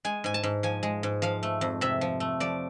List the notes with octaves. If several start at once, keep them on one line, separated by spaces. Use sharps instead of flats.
G#3 G#5
G#2 G#5
A5
G#2
F3 G#5
G#3
G#2
F3 F5
A3
F2
C3 E5
F3
A3
F3 D5